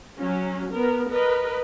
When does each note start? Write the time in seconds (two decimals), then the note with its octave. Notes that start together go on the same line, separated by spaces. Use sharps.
0.20 F#3 C#4
0.74 B3 A#4
1.10 A#4 B4 D#5